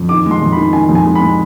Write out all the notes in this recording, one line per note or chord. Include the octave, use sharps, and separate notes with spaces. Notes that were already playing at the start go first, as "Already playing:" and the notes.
Already playing: F2
D#3 D6
G#3
C6
F2
B5
D#3
D#3 G#5
F2
G#5
G#3
B5
G#3